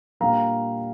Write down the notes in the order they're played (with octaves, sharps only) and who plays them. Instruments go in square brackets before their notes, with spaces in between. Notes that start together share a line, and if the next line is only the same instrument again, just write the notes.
[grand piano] A#2 G3 A#3 D4 F5 A#5